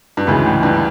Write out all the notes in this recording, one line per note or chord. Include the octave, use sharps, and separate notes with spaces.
G2
D2 G#2 C#3 E3
A2
G2